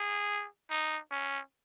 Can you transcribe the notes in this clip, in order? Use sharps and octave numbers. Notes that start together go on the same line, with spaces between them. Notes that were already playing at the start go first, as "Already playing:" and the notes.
Already playing: G#4
D#4
C#4